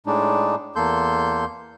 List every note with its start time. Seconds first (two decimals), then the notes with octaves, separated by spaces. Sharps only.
0.06 A2 G#3 D4 D#4
0.76 E2 A#3 A4 C6 G6